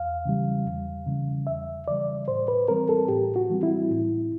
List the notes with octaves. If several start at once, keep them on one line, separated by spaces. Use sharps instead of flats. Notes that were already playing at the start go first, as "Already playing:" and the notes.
Already playing: E2 F5
C#3 E3 G3
E2
C#3 E3 G3
E2 E5
C#3 E3 G3 D5
A2 C5
B4
E3 G3 C4 A#4
A4
A2 G4
F#4
E3 G3 C4
E4
A2